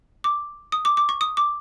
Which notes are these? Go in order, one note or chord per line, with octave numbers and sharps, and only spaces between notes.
D6
D#6
D6
D6
C#6
D#6
D6